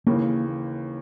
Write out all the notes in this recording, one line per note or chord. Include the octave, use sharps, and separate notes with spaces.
D#2 C#3 E3 A#3